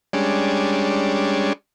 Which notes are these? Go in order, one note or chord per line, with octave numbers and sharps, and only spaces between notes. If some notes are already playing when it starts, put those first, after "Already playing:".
G3 G#3 C#4 D4